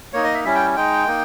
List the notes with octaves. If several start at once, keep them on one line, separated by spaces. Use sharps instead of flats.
A#3 D#4 C#5
D#5
E5
G3 C#4 E4 E5
G5
G#3 D#4 G5
A#3 D#4